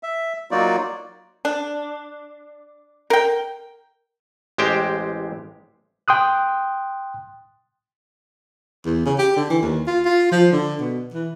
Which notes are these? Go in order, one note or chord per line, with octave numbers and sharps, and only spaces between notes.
E5
F#3 A#3 D#4 F4 F#4 D5
D4
A#4 G5
A1 G#3 G4 C5 G5
G5 C6 D#6 F#6
E2
C#3
G4
D3
E3
D#2
F4
F4
F3
D3
B2
E3